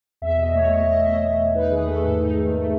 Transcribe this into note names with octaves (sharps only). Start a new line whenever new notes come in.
E2 E5
B2 D#5
A3 C#5
E2 D#5
E2 D#5
E5
B2 D#5
A3
E2
D#4 B4
D#3 G#4
B4
A3 A4
G#2 A4
D#4
D#3
A3